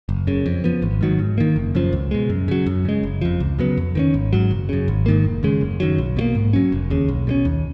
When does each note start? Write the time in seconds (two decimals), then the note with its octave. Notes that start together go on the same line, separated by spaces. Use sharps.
0.09 F#1
0.27 F#2 C#3
0.46 F2
0.64 F3 B3
0.82 G#1
1.01 G#2 D#3 F#3
1.19 G#2
1.38 D#3 A#3
1.56 F#1
1.75 F#2 C#3 F3
1.93 C#2
2.11 B2 G#3
2.30 F#2
2.48 C#3 F#3
2.66 F#2
2.85 C#3 G#3
3.03 F#1
3.21 F2 F3
3.40 C#2
3.59 C#3 F#3 B3
3.77 F2
3.95 D#3 A#3 C#4
4.14 G#1
4.33 G#2 F#3
4.51 F#1
4.69 F#2 C#3
4.88 G#1
5.06 G#2 D#3 A#3
5.24 F1
5.43 D#2 C#3 G#3
5.61 F#1
5.80 F#2 D#3 F#3
5.98 B1
6.17 B2 F#3 A#3
6.35 G#2
6.53 F#3 C#4
6.72 F1
6.90 D#2 C#3
7.08 B1
7.27 B2 G#3 C#4
7.45 D#2